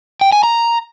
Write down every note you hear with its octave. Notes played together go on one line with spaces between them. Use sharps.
G5
G#5
A#5